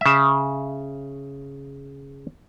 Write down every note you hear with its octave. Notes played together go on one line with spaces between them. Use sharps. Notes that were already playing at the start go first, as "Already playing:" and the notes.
C#3 E5